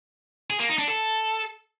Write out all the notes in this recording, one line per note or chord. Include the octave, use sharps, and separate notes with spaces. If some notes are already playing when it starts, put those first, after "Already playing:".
G#4
A#3
D#4
D4
A4